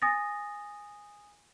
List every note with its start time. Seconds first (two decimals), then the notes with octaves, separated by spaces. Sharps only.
0.02 G#5 D#6 A6 A#6